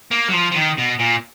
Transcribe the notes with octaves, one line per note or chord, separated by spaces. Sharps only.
A#3
F#3
F3
F3
D#3
B2
A#2